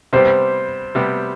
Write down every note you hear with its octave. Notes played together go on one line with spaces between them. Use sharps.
C3 G3 B3 C5
C3 G3 B3